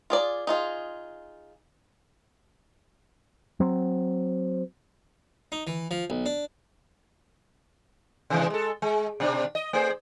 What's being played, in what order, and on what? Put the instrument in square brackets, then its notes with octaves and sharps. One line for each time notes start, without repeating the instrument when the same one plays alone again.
[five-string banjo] F4 G#4 D5
D#4 F4 G#4
[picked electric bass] F#3 C4
[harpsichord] D#4
E3
F3
B1
D4
[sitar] C3 E3 G#3
G#3 A4
G#3
B2 C4 D4
D#5
A3 G#4 C5